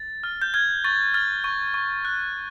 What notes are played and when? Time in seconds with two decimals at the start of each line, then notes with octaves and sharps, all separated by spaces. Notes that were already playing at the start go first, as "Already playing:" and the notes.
Already playing: A6
0.24 F6
0.42 G6
0.54 F6 G#6
0.84 C#6 A6
1.14 F6 A6
1.44 C#6
1.74 C#6
2.05 F#6